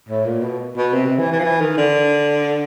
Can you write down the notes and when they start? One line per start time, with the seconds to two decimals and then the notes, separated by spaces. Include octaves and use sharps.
0.09 A2
0.26 A#2
0.43 B2
0.77 B2
0.94 C3
1.06 C3
1.19 E3
1.32 E3
1.39 F3
1.44 E3
1.61 D#3
1.78 D3